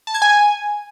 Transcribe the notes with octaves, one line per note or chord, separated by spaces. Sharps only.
A5
G#6
G#5